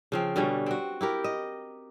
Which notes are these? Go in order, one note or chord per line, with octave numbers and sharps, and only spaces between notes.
C#3 F3 C4
B2 D3 G3 C#4
C4 F#4
E4 G4 A#4
D#5